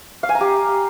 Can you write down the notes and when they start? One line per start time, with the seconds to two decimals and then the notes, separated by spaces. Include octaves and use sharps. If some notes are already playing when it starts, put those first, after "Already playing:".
0.23 F5
0.29 G#5
0.35 A#5
0.41 G4